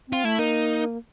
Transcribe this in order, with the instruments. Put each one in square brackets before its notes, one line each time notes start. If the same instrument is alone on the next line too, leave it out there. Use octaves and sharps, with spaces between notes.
[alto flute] C4 [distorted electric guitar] F4
[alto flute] A3 [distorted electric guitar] E4
[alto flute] A#3 [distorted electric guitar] D#4